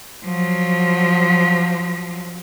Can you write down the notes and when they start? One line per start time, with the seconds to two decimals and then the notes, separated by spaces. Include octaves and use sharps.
0.25 F3 F#3